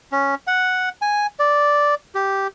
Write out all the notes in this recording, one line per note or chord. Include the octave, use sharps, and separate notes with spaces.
C#4
F#5
G#5
D5
G4